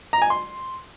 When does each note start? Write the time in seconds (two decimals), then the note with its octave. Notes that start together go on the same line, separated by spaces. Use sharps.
0.13 A#5
0.22 G#5
0.30 C6